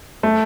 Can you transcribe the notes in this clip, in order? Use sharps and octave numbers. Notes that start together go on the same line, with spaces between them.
A3